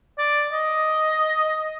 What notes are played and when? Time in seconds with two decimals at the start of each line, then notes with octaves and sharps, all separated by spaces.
0.19 D5
0.52 D#5